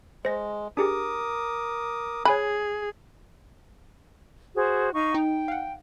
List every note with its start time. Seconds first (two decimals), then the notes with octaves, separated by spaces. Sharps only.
0.25 G#3 C5 A#6
0.77 D4 G4 G#4 A#4 D6 D#6
2.25 G#4 C#5 G#5 B5 F#6
4.56 F#4 G#4 C5
4.93 D#4 F5 C#6
5.14 D#4 G5
5.48 F5 F#5